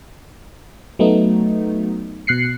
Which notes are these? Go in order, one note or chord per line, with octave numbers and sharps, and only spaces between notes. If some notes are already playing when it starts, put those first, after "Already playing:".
F#3 A3 B3 D#4
B2 F#6 C7 C#7